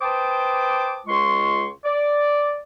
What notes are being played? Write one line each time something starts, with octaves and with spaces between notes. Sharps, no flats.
B4 C5 G5 A5 D6 D#6
C#2 G#3 F4 C6 C#6
D5